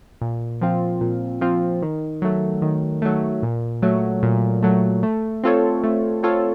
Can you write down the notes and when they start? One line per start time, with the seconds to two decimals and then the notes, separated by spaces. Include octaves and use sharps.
0.21 A#2
0.61 F3 C4 F4
1.01 A#2
1.41 F3 C4 F4
1.82 D#3
2.22 F#3 A3
2.62 D#3
3.02 F#3 A3
3.43 A#2
3.82 F#3 A3
4.23 A#2
4.63 F#3 A3
5.03 A3
5.44 C4 F4 A4 C#5
5.84 A3
6.23 C4 F4 A4 C#5